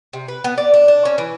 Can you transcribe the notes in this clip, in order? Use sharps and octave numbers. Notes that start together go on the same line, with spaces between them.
C3
B4
B3
D5
D4
D4
C#4
E3